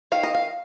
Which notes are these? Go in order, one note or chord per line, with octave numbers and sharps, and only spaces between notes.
D#3 F5
D#5
F5